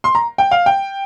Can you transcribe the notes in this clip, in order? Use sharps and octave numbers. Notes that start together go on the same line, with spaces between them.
C6
A#5
G5
F5
G5